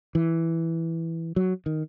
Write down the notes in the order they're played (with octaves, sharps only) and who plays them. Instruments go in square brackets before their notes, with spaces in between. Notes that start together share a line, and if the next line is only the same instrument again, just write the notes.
[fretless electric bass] E3
F#3
D#3